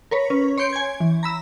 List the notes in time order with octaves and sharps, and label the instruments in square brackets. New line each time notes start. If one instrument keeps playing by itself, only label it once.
[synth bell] A#4 B4 C#5
C#4
C#5 C6 C#6 G6 D7
G#5 G#6
E3
A#5 B5 E6